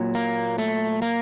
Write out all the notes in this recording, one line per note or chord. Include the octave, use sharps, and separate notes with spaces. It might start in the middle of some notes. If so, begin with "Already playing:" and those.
Already playing: A#2 F#3
A#3
A3
A#3